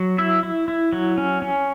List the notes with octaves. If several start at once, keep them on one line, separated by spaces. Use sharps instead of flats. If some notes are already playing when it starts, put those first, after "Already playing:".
Already playing: F#3
E4 E5
E4
E4
F#3
C#4
C#4